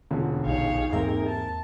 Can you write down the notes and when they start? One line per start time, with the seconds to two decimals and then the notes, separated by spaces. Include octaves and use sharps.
0.11 E1 C#2 D3
0.46 A#1 D#4 G4 G#4 C#5 F5
0.93 E2 G#2 A#3 C4 A#4 E5
1.27 A5